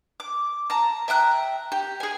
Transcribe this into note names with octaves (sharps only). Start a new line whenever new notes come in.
D6
A5 A#5
E5 G5 A#5 F#6
G4
G#4 G#5